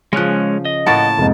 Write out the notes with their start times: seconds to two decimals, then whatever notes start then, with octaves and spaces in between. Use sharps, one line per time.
0.13 C#3 F3 G#3 C#4 F#6
0.65 D#5
0.86 A2 A#3 C#5 F#5 A5 A6
1.18 F1 G#2